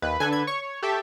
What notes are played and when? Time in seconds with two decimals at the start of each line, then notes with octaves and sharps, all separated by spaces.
0.02 D#2 B4
0.20 D3 A4 B4 G#5
0.33 G#6
0.47 C#5 C#6
0.83 G4 A4 E5